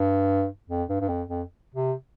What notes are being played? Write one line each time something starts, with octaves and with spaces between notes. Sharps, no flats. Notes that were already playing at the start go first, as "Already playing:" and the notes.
Already playing: G2
F2
G2
G2
F2
F2
C3